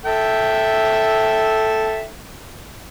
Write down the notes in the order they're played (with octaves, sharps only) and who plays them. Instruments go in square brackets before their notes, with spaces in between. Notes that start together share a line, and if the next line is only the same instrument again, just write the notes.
[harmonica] A4 E5 G5